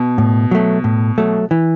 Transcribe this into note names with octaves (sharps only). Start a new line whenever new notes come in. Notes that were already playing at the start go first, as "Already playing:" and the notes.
Already playing: B2
A2
F#3 A3
A2
F#3 A3
E3